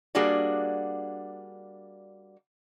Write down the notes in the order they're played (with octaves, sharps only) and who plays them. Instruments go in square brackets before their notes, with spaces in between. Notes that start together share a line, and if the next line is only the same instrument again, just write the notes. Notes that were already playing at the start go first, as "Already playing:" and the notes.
[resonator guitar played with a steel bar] G3 A#3 D4 F#4 G#4 D5